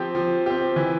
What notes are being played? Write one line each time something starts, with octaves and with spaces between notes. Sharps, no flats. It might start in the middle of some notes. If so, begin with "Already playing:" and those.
Already playing: F3 C4 G4
F3
C4 G4
E3